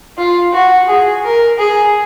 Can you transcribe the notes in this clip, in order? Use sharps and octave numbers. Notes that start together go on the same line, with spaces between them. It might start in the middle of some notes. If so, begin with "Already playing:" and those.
F4
F#4
G#4
A#4
G#4